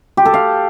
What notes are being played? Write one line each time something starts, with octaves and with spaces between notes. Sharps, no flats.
G4
A4
F5